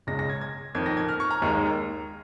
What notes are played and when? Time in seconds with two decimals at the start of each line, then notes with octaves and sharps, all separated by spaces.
0.07 C#2 C#3 G#3 A#6
0.19 A#6
0.30 G#6
0.41 G#6
0.75 F2 D#3 A#3 G#6
0.86 A#6
0.97 G#6
1.09 F6
1.20 C#6
1.31 A#5
1.42 D#2 D#3 G#3 A#5